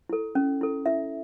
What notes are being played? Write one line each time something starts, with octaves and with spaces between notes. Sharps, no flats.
E4 A4
C#4
E4 A4
E4 E5